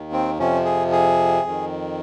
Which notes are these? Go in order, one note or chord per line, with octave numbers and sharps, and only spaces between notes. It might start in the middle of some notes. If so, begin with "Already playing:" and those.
Already playing: D#2 D#3
C4
F2 C3 F3 C#4
G#4
G#4
F2 D#3